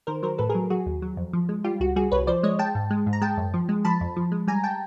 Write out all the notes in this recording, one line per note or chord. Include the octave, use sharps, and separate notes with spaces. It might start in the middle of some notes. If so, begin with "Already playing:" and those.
D#3 A#4 C5
F#3 A#4 C5
A2 A4 B4
G#4 A#4
F#3
F#3 F#4 G#4
D#2
F#3
F2
F3
G#3
G3 F4 G4
C#2 F#4
G3 F#4 G#4
C2 B4 C#5
F3 C5 D5
G#3 C#5 D#5
G#3 G5 A5
G#2
G#3
G#2
A#5
G#3 G5 A5
F#2
F3
G#3
F3 A5 B5
F2
F3
G#3
G3 G#5 A#5
G5 A5